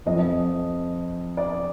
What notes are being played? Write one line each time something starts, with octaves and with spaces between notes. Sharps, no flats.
F2 F3 D#5
D5